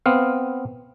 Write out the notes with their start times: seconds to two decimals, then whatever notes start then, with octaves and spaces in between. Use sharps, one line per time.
0.06 B3 C4 F5